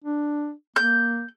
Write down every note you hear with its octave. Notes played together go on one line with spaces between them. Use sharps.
D4
A#3 G6